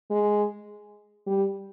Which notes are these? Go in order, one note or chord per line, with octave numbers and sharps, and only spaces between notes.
G#3
G3